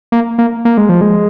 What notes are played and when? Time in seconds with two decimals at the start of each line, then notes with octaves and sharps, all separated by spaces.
0.12 A#3
0.38 A#3
0.65 A#3
0.77 G#3
0.89 F3
1.01 G#3